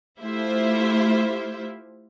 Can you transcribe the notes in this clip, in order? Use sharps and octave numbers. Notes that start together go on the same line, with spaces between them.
A3 E4 F4 G4 C5 E5